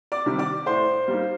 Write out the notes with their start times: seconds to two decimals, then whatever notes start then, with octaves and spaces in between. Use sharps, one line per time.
0.12 D5 D6
0.26 C3 D#3 G3
0.39 D5 D6
0.66 A2 C5 C6
1.08 G3 A#3 D#4